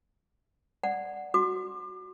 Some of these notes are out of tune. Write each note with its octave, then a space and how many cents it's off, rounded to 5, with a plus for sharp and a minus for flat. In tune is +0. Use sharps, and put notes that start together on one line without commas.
D5 +0 F#5 +0
F#4 +0 D6 +35